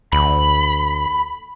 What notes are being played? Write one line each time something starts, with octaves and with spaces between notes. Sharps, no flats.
D2 B5